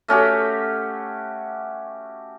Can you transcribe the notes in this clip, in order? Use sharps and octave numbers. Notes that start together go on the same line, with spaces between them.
A3 C#4 F#4 G4